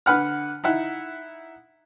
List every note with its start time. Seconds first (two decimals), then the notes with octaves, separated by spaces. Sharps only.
0.06 D3 B4 F#5 F6
0.64 D#4 E4 F#5